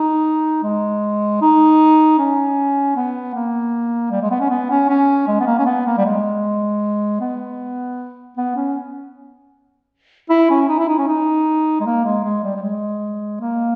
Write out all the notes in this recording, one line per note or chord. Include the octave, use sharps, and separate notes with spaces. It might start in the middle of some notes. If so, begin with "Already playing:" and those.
Already playing: D#4
G#3
D#4
C#4
B3
A#3
G3
G#3
B3
C#4
B3
C#4
C#4
G#3
B3
A#3
C#4
B3
A#3
G3
G#3
B3
B3
C#4
E4
C#4
D#4
E4
D#4
C#4
D#4
G#3
A#3
G#3
G#3
G3
G3
G#3
A#3